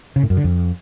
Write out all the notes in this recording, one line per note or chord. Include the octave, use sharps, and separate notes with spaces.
C#3
A2
F#2
D3
F2